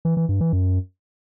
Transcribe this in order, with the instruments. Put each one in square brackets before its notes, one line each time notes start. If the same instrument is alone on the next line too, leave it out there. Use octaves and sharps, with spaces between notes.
[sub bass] E3
E3
G2
E3
F#2